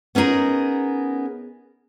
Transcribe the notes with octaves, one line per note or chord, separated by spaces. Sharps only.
B3 C#4 D#4 G#4 A#4